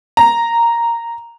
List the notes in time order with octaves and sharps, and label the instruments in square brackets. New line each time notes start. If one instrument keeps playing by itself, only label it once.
[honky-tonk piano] A#5